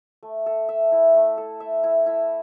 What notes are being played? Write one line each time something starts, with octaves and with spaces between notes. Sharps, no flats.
A3
A4
E5
E4
A3
A4
E5
E4
E4